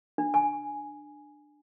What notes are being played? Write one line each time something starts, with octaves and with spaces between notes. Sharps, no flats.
D4
G#5